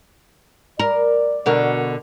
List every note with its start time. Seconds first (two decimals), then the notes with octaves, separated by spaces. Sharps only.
0.79 A#4 D5
1.46 B2 D3 A#4